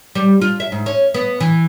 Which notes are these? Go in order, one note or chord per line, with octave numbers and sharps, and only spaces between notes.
G3
F4
E5
G#2
C#4
B3
E3